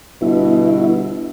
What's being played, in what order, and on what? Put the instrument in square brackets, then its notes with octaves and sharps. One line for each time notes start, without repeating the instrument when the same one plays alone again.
[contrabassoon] G1 [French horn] B2 [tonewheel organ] E4